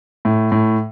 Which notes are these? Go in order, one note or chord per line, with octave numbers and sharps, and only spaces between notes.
A2
A2